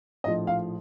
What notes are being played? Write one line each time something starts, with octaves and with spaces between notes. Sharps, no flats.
A#1 A2 F3 D#5
F5